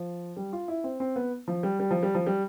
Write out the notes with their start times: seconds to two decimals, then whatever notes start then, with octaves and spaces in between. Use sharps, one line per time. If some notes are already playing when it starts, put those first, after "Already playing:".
Already playing: F3
0.36 G3
0.53 F4
0.68 E4
0.84 C4
1.00 C4
1.16 B3
1.48 F3
1.63 G3
1.80 G3
1.91 F3
2.03 G3
2.15 F3
2.27 G3